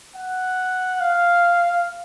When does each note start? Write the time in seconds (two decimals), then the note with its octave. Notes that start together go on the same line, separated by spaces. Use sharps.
0.16 F#5
1.00 F5